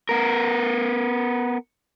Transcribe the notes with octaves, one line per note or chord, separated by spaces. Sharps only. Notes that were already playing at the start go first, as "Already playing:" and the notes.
B3 A#4